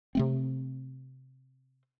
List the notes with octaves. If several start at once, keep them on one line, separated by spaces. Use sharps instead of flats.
C3 A3 C4